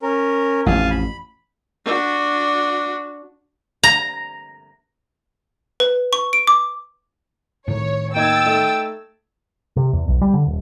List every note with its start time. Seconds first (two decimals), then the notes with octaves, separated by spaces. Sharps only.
0.03 C#4 A#4
0.66 A1 F2 F5 G#5 A5
0.91 B5
1.85 D4 F#4
3.83 A#5
5.80 B4
6.13 C#6
6.33 D7
6.47 D6
7.68 A2 D#3 C#5
8.15 D#2 D#4 G5 E6 G#6 A6
8.45 A3 D#4
9.76 C3
9.93 E2
10.08 B1
10.21 G3
10.34 D3
10.46 D#1